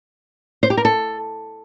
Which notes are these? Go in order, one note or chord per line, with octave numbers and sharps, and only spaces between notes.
C5
G4
A#4
A4